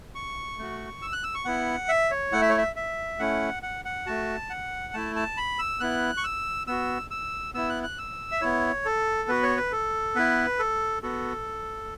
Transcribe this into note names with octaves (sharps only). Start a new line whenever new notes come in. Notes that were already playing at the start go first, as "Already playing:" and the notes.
C#6
A3 F#4
E6
F#6
E6
C#6
B3 E4 F#5
E5
C#5
A3 E4 F#5
E5
C#5
E5
E5
A3 C#4 E4 F#5
F#5
F#5
A3 F#4 A5
F#5
A3 E4 A5
A5
B5
E6
B3 E4 F#6
C#6
E6
B3 F#4 E6
E6
B3 E4 E6
F#6
F#6
E6
E5
B3 E4 C#5
A4
B3 F#4 B4
C#5
B4
A4
B3 E4 B4
A4
B3 F#4 A4